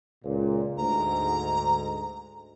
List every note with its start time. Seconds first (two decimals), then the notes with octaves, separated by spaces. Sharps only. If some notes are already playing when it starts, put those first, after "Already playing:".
0.24 C#2 A#2
0.77 D2 G#2 A#5